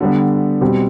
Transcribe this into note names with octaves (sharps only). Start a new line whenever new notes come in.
D3 G3 B3
B2 G3 C4 G4